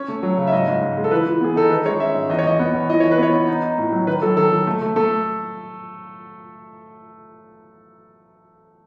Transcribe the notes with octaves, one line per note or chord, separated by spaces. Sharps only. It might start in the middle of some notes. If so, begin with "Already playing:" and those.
Already playing: C#4 C#5
A3
F#3
C#3
E5
G#2 D#5
G#2
G#2
G#3
A4
E3 B4
E3
B3 G#4
D#4 A4
D#3 B4
G#3 C#5
C#4 E5
G#2
E2 D#5
C#5
E2 D#5
B3
E2
E3 D#5
E3 C#5
B4
B3 C#5
B3
D#4
D#4
A2
F#3
D#3 B4
F#3 A4
D#3 A4
D#3
A3
A3
A3 A4